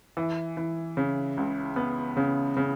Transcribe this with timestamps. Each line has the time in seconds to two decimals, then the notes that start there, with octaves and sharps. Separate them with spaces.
0.17 E3
0.57 E3
0.97 C#3
1.37 C#2
1.76 B3
2.17 C#3
2.57 C#3